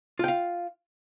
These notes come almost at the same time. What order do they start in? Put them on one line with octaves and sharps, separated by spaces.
F4 G5 F5